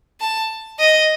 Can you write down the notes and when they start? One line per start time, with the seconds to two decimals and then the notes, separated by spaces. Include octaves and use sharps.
0.21 A5
0.79 D#5